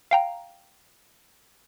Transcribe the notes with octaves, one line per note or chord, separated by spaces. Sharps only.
F5 G5 A#5